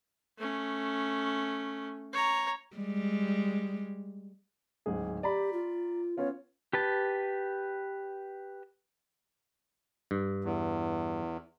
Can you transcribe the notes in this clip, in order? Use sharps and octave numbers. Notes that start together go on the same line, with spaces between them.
A3 C#4
C#5 A#5
G3 G#3
D1 G#2 G#4
G4 D5 A#5 B5
F4
B3 C#4 F4 C#5
G4 B4 A5
G2
E2